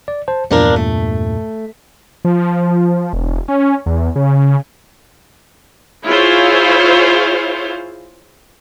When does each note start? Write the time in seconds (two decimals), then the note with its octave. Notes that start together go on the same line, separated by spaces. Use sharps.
0.08 D5
0.28 C5 A5
0.51 E2 G2 A#2 F3 D4 A#4
0.76 A3
2.25 F3
3.13 E1
3.48 C#4
3.86 E2
4.16 C#3
6.05 E4 F4 G#4 C5 C#5 F5